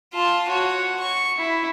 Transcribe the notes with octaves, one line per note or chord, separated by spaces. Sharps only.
F4 A5
F#4 C#5
C#6
E4